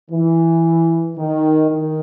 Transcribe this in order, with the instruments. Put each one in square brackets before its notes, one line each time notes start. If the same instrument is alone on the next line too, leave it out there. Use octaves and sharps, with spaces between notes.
[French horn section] E3
D#3
D#3